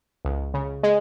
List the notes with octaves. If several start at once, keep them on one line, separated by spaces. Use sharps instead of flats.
C#2
C#3
G#3